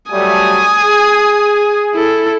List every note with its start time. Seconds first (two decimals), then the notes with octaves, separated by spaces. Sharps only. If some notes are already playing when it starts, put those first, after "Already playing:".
0.12 F#3 G3 A3 G#5 D#6
0.81 G#4
1.94 E4 A4